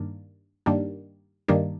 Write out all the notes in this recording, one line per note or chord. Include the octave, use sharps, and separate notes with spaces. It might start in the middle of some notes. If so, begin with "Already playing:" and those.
Already playing: G2 D#3 A#3 D4
G2 D#3 G3 A#3 D4
G2 D#3 G3 A#3 D4